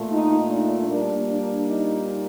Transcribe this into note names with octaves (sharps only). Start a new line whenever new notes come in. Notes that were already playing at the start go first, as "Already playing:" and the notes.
Already playing: A#2 A3
D#4
D4
A#2 G3 A#3 D4
D4
D#4